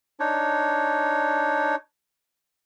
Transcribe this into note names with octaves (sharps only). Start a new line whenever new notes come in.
D4 D#4 C#5